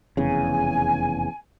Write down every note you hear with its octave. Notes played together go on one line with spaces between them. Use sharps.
F1 E2 C#3 G#5